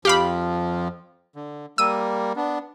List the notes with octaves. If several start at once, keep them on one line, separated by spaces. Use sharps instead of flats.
F2 F3 G4 F5 B5
D3
G3 A#3 E6 D#7
B3 D4